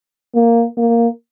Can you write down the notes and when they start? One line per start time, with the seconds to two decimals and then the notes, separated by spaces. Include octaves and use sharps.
0.35 A#3
0.77 A#3